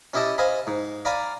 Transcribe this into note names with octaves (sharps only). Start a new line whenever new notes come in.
C#4 E4 G4 D#5 A5
C5 D#5 F5 G#5 B5
G#2
D5 F5 G#5 A#5 B5 D6